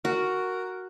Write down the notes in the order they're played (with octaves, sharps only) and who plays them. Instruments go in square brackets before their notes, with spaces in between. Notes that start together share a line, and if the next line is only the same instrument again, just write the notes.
[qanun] F#4 [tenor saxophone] A#4